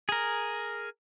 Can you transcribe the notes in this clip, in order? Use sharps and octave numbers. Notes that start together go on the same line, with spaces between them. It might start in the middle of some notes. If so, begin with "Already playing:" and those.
G#4 A#4